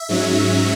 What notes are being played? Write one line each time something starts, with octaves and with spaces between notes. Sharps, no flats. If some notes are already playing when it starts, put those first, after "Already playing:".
Already playing: E5
G#2 F#3 C#4